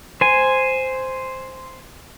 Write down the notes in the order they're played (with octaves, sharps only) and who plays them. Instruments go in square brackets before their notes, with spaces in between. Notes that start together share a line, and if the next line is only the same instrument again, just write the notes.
[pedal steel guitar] C5 G#5